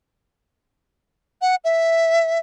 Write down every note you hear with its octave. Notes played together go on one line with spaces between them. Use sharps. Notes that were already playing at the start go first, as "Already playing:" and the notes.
F#5
E5